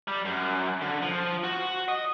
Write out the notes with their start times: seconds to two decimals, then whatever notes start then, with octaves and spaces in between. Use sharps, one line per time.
0.08 G3
0.25 F#2
0.81 D3
1.02 F3
1.44 F#4
1.88 D#5